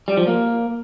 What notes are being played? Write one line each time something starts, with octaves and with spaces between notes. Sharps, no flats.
G3
F3
A#3